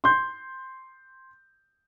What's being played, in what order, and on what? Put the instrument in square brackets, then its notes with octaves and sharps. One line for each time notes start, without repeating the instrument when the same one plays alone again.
[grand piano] C6 G6